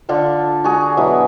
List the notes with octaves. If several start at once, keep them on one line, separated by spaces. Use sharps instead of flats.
D3 D4 F4 A4
F#4 G#4 A#5
B2 F#3 E4 G#4